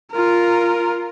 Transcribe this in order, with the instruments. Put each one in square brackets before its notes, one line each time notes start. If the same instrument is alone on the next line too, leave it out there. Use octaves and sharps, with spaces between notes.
[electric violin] F4 A#4